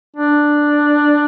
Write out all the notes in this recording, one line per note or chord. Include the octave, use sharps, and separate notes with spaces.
D4